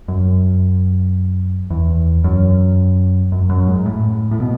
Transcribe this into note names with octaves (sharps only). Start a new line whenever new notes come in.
F#2
E2
F#2
F#2
F#2
G#2
A2
A2
B2